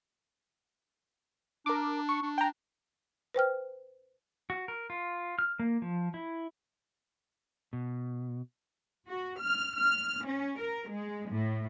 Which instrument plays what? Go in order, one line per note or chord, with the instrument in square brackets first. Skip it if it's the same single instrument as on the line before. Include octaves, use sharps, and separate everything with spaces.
[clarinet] D4 [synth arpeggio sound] A#4 D6
[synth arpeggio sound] C#6
[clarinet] D4
[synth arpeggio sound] G5 A#5
[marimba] B4 C5 G5 F6
[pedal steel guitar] F#4
A#4
F4
F6
A#3
F3
E4
[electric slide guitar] B2
[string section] F#4
F6
F6
C#4
A#4
G#3
A2